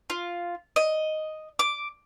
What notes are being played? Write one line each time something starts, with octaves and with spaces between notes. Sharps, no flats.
F4
D#5
D6